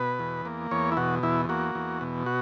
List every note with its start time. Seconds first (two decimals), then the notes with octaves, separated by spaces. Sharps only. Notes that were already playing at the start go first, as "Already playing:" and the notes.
Already playing: B2 B4
0.19 E2
0.45 A#3
0.71 E2 C#5
0.92 E4
0.97 B2 F#4
1.23 E2 E4
1.49 A#3 F#4
1.75 E2
2.01 B2
2.26 F#4